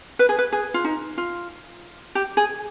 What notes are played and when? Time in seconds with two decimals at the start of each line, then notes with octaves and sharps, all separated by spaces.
0.19 B4
0.29 G#4
0.39 B4
0.53 G#4
0.74 F4
0.84 D#4
1.18 F4
2.15 G4
2.37 G#4